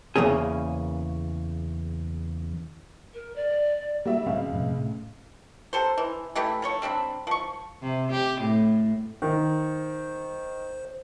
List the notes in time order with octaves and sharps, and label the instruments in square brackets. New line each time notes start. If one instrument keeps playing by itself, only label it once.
[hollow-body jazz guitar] E2 C#3 A#3 C#4 G#4
[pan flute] A#4
D5
[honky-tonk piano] G3 F#4 E5 [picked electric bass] A#3
[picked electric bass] D1 C4 C#4 [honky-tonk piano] C#2 F5
[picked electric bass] F2 A2 C3
A2
[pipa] D3 G4 A4 C5
E3
E3 A3 G4 B5
F3 A3 C#5
G3 C4 D4 B5
F3 C#6
[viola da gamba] C3
G4
A2
[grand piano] D#3 [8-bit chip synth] C5